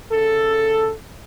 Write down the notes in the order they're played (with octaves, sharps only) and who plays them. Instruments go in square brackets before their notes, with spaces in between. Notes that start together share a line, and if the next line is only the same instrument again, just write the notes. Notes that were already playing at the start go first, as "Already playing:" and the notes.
[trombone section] C#3 A4